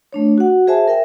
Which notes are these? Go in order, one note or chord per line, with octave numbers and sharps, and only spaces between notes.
A3 D4 C#5
F#4 F#5
G#4 C5 E5 G#5 A5
A#4 E5 G5